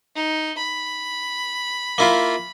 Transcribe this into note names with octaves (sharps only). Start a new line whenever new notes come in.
D#4
B5
A#3 E4 F4